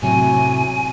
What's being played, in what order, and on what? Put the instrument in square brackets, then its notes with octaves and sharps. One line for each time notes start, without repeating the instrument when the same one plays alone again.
[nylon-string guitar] A2 C3 F#3 [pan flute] G#5